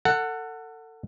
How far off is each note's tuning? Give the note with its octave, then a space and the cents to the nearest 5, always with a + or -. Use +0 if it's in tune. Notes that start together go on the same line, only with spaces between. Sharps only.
A4 +30 F#5 +0